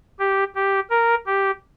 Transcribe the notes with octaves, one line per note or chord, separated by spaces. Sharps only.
G4
G4
A#4
G4